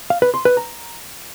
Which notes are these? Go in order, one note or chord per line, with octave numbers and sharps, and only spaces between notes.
F5
B4
C6
B4
A#5